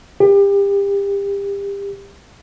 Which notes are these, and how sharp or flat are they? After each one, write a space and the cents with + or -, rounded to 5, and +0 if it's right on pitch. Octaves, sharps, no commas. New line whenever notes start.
G4 +30